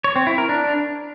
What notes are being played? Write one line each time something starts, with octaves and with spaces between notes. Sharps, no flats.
C#5
C4
E4
A#4
D4